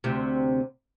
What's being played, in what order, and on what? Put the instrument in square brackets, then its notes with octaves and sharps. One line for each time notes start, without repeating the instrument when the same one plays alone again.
[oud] D2 C3